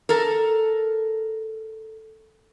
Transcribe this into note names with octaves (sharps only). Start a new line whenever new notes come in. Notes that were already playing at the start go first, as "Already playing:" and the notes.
A4 A#4